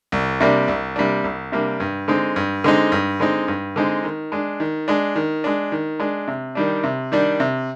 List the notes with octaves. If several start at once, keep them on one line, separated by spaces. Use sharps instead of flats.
C2
C3 G3 A#3 D4
C2
C3 G3 A#3 D4
C2
C3 G3 A#3 D4
G2
D3 G#3 C4 D#4
G2
D3 G#3 C4 D#4
G2
D3 G#3 C4 D#4
G2
D3 G#3 C4 D#4
D#3
G#3 D4
D#3
G#3 D4
D#3
G#3 D4
D#3
G#3 D4
C3
D#3 G3 D4
C3
D#3 G3 D4
C3